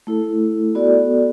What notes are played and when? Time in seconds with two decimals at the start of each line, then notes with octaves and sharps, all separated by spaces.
0.07 A3 E4 A4
0.75 B3 F#4 A4 D5